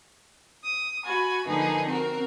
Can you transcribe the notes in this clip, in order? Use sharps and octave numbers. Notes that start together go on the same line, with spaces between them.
D#6
F#4 G#5 B5
D3 F3 A#3 D#4 G#4 B4
C4 F#4 A#4